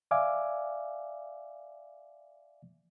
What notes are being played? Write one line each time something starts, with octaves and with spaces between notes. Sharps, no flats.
D5 E5 F5 G#5 D6